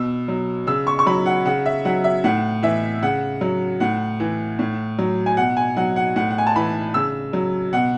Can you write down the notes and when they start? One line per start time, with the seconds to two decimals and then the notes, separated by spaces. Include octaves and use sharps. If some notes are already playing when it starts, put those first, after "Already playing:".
Already playing: B2 E6
0.28 F#3
0.67 C#3 E6
0.87 C#6
0.99 C#6
1.06 F#3 B5
1.26 F#5
1.45 C#3 F#5
1.66 E5
1.85 F#3 F#5
2.04 E5
2.24 A2 F#5
2.63 E3 E5
3.03 C#3 F#5
3.41 F#3
3.80 A2 F#5
4.20 E3
4.59 A2
4.99 F#3
5.26 G#5
5.37 B2 F#5
5.57 G#5
5.77 F#3 F#5
5.96 F#5
6.16 A2 F#5
6.31 F#5
6.38 G#5
6.47 A5
6.56 E3 B5
6.94 C#3 E6
7.33 F#3
7.73 B2 F#5